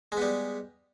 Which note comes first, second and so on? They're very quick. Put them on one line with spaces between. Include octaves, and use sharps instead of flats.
G#3 B3 G3